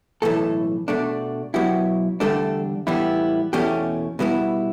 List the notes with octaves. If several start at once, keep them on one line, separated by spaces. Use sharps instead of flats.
B1 A2 E3 A3 A4
B2 A3 D4
B2 F#3 B3 E4 G4
E2 D3 G3 A3 D4 A4
A2 E3 G3 B3 E4
E2 B2 A3 C#4 E4 G4
B2 G3 B3 E4